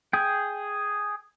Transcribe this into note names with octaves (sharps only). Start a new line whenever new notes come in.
G#4 G5